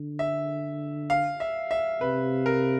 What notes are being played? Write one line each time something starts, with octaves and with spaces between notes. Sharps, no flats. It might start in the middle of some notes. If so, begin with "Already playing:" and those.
Already playing: D3
E5
F5
E5
E5
C3 B4
A#4